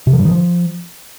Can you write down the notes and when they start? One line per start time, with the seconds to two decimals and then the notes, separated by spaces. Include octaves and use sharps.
0.07 C3
0.13 F3
0.19 G2
0.25 D#3
0.31 F3